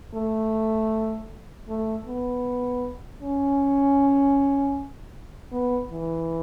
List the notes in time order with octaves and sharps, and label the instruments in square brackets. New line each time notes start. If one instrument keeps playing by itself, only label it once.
[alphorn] A3
A3
B3
C#4
B3
E3